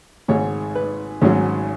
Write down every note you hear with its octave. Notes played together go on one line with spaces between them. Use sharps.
G#1 G#2 G#3 C#5
B4
G#1 G#2 F#3 C#4